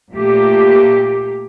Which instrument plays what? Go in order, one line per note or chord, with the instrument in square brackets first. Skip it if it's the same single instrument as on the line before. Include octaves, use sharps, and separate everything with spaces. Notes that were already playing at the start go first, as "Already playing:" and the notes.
[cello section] A#2 A3 A#3 G4